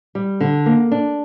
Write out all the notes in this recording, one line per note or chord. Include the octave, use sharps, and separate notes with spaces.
G3
D3
A#3
D4